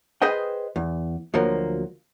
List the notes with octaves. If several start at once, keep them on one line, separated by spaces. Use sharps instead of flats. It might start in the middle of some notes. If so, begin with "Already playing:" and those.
G#4 B4 C5 D#5 G5
E2
D2 F3 F#3 A#3